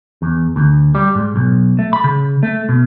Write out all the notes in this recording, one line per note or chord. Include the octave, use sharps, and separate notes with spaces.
E2
D2
G3
G#2
B1
A3
B5
C#3
A3
B2